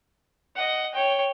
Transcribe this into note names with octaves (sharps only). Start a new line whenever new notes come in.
D#5 F#5
C#5 G5